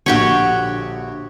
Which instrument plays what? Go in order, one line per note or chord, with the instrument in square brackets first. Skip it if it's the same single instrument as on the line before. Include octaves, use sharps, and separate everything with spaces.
[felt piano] A#1 D3 [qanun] F#4 G4 C#5